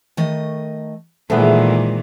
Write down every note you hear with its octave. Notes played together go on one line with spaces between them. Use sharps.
D#3 A3 D#5
A#2 D#3 E3 G#3 A3 B3 C5